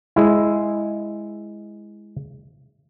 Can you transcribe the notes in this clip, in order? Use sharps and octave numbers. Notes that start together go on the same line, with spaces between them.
G#3 E4